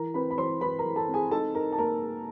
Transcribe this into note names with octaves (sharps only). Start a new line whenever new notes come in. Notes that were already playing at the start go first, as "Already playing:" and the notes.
Already playing: E3 A#4 A#5
C4 B4 B5
B5
E3 C5 C6
E3 B4 B5
A#4 A#5
E3
A4 A5
C4
G#4 G#5
D#4 A4 A5
D#4 A#4 A#5
A5
A#3 A#4 A#5